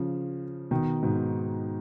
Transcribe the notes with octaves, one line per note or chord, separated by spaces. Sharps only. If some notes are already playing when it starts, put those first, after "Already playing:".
Already playing: C#3 F3
B2 D#3
G#2 B2